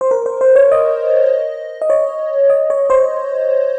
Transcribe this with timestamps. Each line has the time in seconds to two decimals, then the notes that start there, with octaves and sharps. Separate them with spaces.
0.01 C5
0.11 A#4
0.26 C5
0.41 C5
0.56 C#5
0.72 D#5
1.82 D#5
1.90 C#5
2.50 D#5
2.70 C#5
2.90 C5